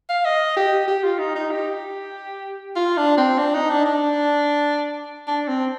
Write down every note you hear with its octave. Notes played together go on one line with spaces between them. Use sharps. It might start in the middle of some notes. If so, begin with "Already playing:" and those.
F5
D#5
G4
G4
F4
D#4
D#4
G4
F4
D4
C4
D4
D#4
D4
D4
D4
C4